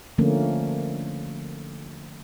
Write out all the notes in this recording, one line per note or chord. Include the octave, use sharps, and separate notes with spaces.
D3 F3 A3 A#3 C#4